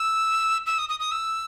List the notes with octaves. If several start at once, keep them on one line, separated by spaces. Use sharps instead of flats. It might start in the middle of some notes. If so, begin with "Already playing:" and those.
Already playing: E6
E6
D#6
D#6
D#6
E6